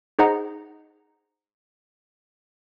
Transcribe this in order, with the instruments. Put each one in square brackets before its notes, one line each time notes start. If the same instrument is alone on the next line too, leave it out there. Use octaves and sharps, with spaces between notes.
[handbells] D#4 G#4 C5 D#5 F#5 A#5